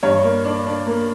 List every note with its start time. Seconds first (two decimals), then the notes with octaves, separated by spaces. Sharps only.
0.03 G2 C#5
0.24 A#3
0.45 D4
0.66 D4
0.87 A#3